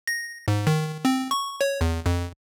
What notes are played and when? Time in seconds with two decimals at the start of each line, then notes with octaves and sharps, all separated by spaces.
0.07 A#6
0.48 G#2
0.67 D#3
1.05 C4
1.31 C#6
1.61 C#5
1.81 E2
2.06 F2